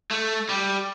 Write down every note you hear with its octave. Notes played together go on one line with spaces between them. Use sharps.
A3
G3